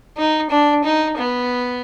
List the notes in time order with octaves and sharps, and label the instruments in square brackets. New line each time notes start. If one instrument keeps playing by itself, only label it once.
[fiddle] D#4
D4
D#4
B3